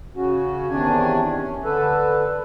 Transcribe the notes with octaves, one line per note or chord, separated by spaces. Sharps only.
C#3 C#4 F#4
E2 C3 D#3 C#4 D4 G#5
C#4
D3 A4 B4